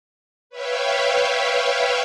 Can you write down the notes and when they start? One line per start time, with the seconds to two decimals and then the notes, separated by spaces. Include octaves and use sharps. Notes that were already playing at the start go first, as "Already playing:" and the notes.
0.50 B4 C#5 E5 F5 G5